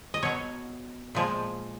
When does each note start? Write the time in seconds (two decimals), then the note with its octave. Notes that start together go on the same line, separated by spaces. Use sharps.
0.14 D#5
0.22 B2 F#3 C#5
1.15 A#2 F3 G#3